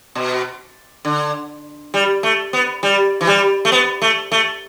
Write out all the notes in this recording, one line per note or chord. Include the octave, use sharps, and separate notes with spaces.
B2
D3
G3
A3
B3
G3
E3
G3
A3
B3
A3
A3